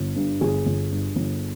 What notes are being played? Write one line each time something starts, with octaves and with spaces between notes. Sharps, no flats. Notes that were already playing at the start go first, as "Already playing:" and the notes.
Already playing: G1
G2
G1 G#4
G1
G2
G1